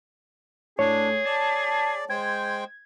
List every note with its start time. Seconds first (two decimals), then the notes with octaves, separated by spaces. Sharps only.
0.79 A2 D4 G#4 C#5
1.25 D5 A5
2.10 G#3 C5 G5 G#6